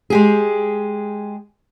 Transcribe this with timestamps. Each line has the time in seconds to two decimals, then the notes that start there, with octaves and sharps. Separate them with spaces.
0.10 G#3 G4 G#4